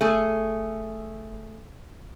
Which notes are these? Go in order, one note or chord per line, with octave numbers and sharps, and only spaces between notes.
F#1 A3 G#4